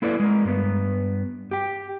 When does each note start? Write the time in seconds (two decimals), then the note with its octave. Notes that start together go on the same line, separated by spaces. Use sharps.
0.02 A#3 E4 A4 B4 D5
0.20 G#3 A#4
0.45 G2 B3
1.51 G4 G5